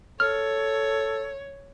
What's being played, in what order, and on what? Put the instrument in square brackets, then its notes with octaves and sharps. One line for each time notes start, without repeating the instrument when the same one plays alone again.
[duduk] A4 [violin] C#5 [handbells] F6